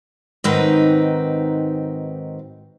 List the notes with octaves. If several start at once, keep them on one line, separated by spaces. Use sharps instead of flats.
G#2 D#3 C4 D#4 F#4 B4